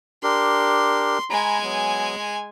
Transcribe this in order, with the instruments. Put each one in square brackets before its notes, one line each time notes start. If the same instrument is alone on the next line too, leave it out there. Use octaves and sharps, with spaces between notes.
[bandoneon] D4 G4 A#4 [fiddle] C6
[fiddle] G#3 G#5 [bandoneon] A#5 B5
[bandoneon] F#3 B3